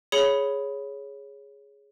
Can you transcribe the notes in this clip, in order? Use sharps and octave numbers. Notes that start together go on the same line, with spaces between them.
G#4 C#5 B5 C#7 F7 G7